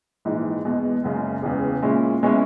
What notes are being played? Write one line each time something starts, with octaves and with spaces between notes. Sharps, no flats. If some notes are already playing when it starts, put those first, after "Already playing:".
A#1 G#2 E3
E2 B2 G#3
F#1 F#2 C#3 G#3
E1 E2 C#3
A#2 G#3 C#4 E4
B2 G#3 C#4 E4